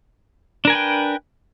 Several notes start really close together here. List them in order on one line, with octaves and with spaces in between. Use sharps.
D4 A#4 G#5 B4 G5